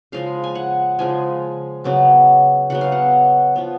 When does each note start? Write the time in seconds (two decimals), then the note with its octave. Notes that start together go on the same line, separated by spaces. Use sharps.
0.12 C#3 F3 G#3 F5
0.44 G#5
0.55 F#5
0.99 C#3 F3 G#3 G#5
1.84 C#3 F#3 B3
2.70 C#3 F#3 B3 F#5
2.81 F5
2.92 F#5
3.56 F3 B3